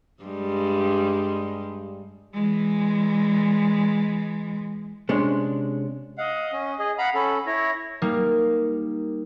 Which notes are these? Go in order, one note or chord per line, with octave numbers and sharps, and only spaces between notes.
G2 G3 G#3
E3 G#3
C3 G#3 C#4 D4
D#5 F5 F#5
C#4
G#4 D#5
F5 F#5 A#5 B5
C#4 A4 B5
E4 C#5 A#6
G3 A#3 D#4